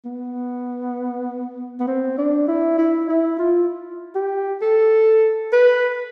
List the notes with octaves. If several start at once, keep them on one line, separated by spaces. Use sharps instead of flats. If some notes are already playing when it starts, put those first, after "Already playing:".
B3
B3
C4
D4
E4
E4
E4
F4
G4
A4
B4